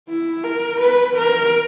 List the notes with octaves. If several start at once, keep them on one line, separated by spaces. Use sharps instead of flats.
E4
A#4
B4
A#4